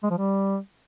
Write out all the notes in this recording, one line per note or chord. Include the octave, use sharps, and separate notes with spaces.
G#3
F3
G3